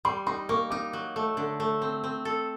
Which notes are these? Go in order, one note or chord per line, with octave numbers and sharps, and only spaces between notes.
G3 C6
D#4 C6
A#3 C#6
D#4 D6
F#3
A3
D3
A3
C4
C4
A4